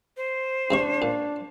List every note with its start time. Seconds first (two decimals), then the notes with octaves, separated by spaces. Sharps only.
0.17 C5
0.71 E2 C3 D4 C#6
1.02 A#2